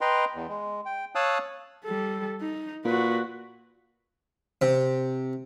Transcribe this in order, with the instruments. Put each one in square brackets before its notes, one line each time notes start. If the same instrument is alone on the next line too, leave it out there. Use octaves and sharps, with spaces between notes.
[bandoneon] B4 D#5 G5 A#5 C6
E2
G#3
G5
C#5 F5 A5 D#6 E6 F#6
[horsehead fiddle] G3 A4
D#4
[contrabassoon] A#2 [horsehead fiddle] F#4 B4
[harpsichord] C3